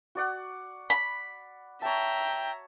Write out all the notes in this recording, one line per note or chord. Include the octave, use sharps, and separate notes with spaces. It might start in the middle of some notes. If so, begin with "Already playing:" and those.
F#4 D5 F#5
B5
C#5 E5 G5 A5 A#5